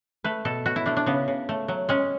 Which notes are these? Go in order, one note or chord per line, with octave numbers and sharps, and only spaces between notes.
A3 B4
B2 A4
B2 F#4
E4
A3 D4
D4
C#3 B3
C#3
A3
F#3
G#3 C#4